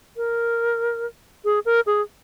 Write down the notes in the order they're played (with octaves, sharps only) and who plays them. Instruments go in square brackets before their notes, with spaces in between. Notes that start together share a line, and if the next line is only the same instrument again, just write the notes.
[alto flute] A#4
G#4
A#4
G#4